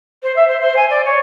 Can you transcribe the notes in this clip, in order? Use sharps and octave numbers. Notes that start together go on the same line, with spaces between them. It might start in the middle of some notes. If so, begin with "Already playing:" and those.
C5
E5
C5
C5
G#5
D5
C#5